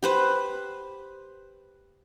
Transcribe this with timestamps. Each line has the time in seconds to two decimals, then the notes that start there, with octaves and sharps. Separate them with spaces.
0.03 G4 B4 C5